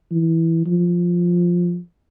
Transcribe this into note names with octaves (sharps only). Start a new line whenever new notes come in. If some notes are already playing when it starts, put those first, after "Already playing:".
E3
F3